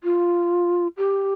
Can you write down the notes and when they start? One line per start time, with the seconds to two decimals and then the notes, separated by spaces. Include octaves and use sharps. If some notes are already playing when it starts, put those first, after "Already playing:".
0.04 F4
0.97 G4